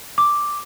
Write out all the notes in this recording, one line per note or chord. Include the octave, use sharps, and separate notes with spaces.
D6